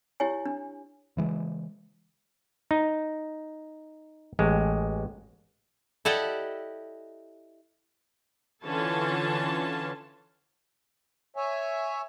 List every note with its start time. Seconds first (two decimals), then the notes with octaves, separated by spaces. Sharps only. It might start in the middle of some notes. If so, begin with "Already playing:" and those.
0.20 E4 G4 C#5 G#5
0.45 D4
1.17 C#3 E3 G#3
2.71 D#4
4.39 A1 G#3
6.05 E4 G4 A4 D5 D#5 F#5
8.64 D3 E3 C#4 F4 A4 A5
11.37 C#5 E5 G#5